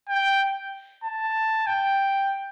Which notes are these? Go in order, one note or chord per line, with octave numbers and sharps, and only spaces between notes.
G5
A5
G5